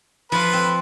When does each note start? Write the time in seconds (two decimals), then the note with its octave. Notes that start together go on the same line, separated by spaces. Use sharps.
0.32 F3 F4 B4 B5
0.53 C4